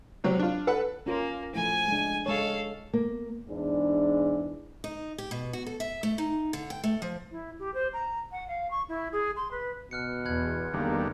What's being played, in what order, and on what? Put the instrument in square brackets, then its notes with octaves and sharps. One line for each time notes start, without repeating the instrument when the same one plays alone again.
[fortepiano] C3 F#3 C4
D4 F4
A4 B4 F#5
[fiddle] A#3 [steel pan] C#4 F4 A#4
[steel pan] F3 A3 E4 [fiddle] G#5
[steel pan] G#3 D4
[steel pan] G#3 C#5 [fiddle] A4 F5
[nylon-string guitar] A#3
[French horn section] E2 G#2 E3 D4
[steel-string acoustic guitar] D#4
G4
B2
F#4
A4
E5
A3
D#4
D3
G5
A3
F3
[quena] E4
G4
C5
A#5
F#5
F5
C#6
E4
G#4
C6
B4
[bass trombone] B2 [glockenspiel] F6 F#6 C#7
[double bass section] E2 [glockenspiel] B5 F#6 G#6
[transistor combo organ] D3 D#3 G3 [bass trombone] A#3